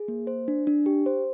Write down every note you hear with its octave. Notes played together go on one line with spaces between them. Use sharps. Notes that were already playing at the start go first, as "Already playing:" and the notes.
Already playing: G#4
A#3
C5
D4
D4
G4
C5